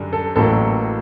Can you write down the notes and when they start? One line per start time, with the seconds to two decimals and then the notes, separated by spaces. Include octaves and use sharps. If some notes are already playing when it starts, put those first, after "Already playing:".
Already playing: F#2 D3 G3
0.13 A4
0.36 A1 A2 F#3 A#3 A4